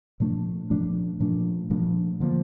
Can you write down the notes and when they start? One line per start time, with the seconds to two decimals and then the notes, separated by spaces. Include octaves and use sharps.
0.20 A#2 F3 A3 D4
0.70 A#2 F3 A3 D4
1.20 A#2 F3 A3 D4
1.70 A#2 F3 A3 D4
2.20 D3 F3 A#3